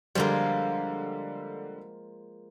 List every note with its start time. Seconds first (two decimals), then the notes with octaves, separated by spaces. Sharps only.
0.15 D3 F3 G3 G#3 A#3